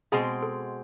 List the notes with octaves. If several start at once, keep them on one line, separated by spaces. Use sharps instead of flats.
B2 G#3 C4 G#4
A4